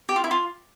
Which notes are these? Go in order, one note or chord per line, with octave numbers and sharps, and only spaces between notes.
G4
F4
E4
F4